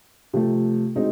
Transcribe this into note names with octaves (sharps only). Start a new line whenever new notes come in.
C3 F3 A3
B2 G#3 C4 D#4